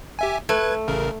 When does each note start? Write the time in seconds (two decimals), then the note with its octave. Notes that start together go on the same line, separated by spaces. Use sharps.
0.19 G4 E5 G#5
0.49 A3 B4 F#6 G#6
0.88 A1 C#3 A#4